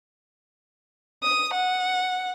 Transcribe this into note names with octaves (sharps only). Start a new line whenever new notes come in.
D#6
F#5